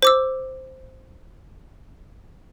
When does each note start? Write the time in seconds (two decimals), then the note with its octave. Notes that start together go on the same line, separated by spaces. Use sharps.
0.02 C5 D6 E6